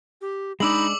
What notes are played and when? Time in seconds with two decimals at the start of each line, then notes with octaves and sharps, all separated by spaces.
0.21 G4
0.60 G#3 D4 D#4 B5 D6 E6 F#7